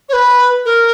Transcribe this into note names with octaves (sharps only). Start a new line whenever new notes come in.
C#5
B4
A#4